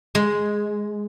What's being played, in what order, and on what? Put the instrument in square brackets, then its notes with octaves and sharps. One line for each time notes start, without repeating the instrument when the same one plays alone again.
[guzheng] G#3